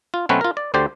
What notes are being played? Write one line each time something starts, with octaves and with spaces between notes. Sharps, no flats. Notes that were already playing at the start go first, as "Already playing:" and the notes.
F4
B2 F#3 A3 C4 C#4 B4
F4 A#4
D5
D2 D3 G4 C5 D5